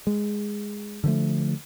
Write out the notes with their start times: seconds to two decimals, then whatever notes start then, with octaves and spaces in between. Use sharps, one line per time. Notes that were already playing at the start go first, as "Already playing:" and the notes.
0.07 G#3
1.04 D3 F3 A3